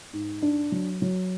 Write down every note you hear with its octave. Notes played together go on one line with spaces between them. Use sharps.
G#2
D4
F#3
F#3